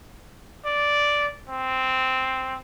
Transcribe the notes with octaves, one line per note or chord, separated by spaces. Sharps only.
D5
C4